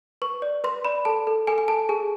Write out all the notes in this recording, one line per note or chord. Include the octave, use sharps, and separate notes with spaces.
B4 C#6
D5
B4 C6
D5 B5
A4 A5
A4
A4 G#5
G#5
A4 A5
G#4 G#5